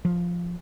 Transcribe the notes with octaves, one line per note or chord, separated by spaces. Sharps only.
F3